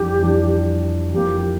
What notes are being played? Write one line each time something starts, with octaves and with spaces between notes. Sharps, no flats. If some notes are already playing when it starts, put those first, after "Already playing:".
Already playing: F2 E3 G3 D4 G4
F2 E3 G3 D4
F2 E3 A#3 G4